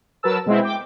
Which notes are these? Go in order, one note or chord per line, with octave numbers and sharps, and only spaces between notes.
F#3 A#4 B4 A5 E6
B2 G#3 C4 E4
G5 D6